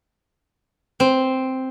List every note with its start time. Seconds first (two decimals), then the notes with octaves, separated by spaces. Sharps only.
1.00 C4